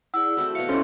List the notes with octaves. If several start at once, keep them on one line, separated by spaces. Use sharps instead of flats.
E4 G#4 D5 F#5 E6
A3 C4 F#4 B5
B2 E5 F5 C#7
C#4 D#4 E4 G4 A4 C5 C6 C#6